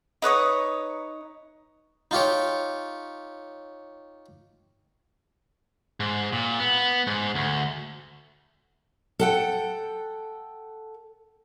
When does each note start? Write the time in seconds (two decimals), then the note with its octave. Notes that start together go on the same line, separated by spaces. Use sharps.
0.22 D#4 B4 C#5 D#6
2.11 D#4 F4 G4 C#5
6.00 G#2
6.33 A#2
6.60 B3
7.07 G#2
7.35 D2
9.19 A4 F#5 G5